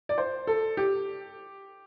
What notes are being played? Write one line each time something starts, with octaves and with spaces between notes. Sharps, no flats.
D5
C5
A4
G4